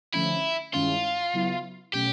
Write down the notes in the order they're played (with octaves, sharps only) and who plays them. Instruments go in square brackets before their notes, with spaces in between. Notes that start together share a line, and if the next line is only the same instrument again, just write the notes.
[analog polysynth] D3 F3 A3 C#4 [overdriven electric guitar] E4
[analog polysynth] G2 D#3 G#3 C#4 E4 [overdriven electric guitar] F4
[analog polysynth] C#3 F#3 B3 E4
[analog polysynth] B2 F#3 A3 C#4 [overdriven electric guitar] G4